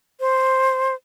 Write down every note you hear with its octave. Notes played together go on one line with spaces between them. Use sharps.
C5